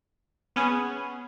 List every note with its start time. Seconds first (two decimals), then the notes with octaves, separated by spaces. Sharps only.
0.56 B3 C#4 G#4